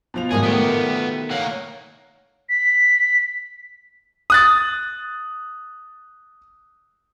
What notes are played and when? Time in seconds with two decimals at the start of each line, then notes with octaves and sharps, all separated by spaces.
0.14 B2 F3 F7
0.31 E2 G#2 G3 G#4 A#4
0.43 D#3 A3 B3 G4
1.31 A#3 F#4 C#5
2.49 B6
4.30 D#6 F#6 A6